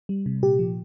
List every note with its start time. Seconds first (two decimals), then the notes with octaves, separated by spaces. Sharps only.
0.09 G3
0.26 C3
0.43 A#2 G4
0.59 F3